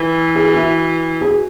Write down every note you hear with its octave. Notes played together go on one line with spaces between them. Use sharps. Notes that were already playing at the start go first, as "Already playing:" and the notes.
Already playing: E3
G#4
F#4
E4
F#4
G#4
F#4